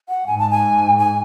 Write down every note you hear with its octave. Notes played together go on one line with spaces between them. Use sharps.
F#5
G#2 G#5
A5
G#5
G#5